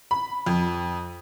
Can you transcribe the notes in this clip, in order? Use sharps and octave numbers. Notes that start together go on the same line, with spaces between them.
B5
F2